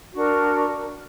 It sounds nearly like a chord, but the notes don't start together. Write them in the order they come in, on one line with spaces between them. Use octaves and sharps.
F#4 D4 A#4